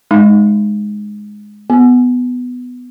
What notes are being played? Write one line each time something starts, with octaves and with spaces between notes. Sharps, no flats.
G#3 D#4
B3